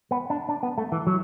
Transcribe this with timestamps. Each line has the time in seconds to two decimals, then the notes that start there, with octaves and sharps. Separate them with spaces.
0.11 B3
0.30 D4
0.49 D4
0.63 B3
0.78 A3
0.92 E3
1.07 F#3